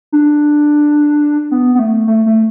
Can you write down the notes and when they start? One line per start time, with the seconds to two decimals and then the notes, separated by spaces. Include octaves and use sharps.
0.12 D4
1.51 B3
1.75 B3
1.79 A3
2.07 A3
2.26 A3